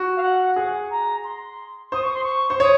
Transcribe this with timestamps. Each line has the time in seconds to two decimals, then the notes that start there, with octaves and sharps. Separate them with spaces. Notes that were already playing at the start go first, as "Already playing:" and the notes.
Already playing: F#4
0.16 F5
0.22 F#5
0.56 G#4
0.90 A#5
1.24 C6
1.92 C5 D#6
2.02 C#6
2.13 C6
2.23 C#6
2.50 C5
2.60 C#5 D#6